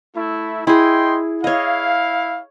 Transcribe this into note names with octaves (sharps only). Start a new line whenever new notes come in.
A3 E4
E4 G#4 D#5 G5 C6
E4 C#5 D#5 F5